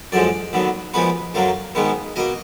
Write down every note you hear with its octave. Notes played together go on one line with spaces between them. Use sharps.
F#2 D3 F3 G#3 D5
D#2 D3 F#3 B3
A#2 F3 G#3 B3 B4
F#2 D3 F#3 A#3 F5
G#2 D#3 G#3 B3
B2 A#3 D#5